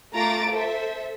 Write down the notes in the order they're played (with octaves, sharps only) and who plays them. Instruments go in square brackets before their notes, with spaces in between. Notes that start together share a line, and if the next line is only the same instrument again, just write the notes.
[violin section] A3 F4 A#5 D6 A6 D7
A4 C5 E5